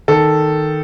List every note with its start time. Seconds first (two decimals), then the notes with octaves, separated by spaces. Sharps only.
0.08 D#3 A4